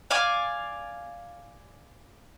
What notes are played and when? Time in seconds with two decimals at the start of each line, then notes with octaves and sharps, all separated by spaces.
0.11 D5 F5 G#5 D6